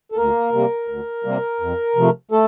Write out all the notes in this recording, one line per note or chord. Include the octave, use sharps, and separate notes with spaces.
A4
D2 A#3 A#4
C3 G3 A#3
D2
C3 G3 A#3
F2
C3 F3 A3
A3 A4